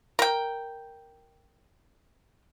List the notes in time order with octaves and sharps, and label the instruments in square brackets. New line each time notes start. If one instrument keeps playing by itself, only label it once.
[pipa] A#4 G5